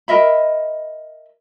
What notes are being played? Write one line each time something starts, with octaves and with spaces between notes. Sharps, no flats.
A#4 D#5 E5 B5